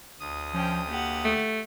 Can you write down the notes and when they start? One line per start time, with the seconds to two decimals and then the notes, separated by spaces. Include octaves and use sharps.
0.20 D2 D#6
0.54 F3 C#4 G5
0.88 A#3 G4 F#5
1.25 A3